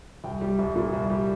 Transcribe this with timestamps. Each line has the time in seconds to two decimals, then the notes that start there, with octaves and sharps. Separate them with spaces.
0.24 C2 G5
0.41 G3
0.59 C2
0.76 A#2
0.93 C2
1.10 G3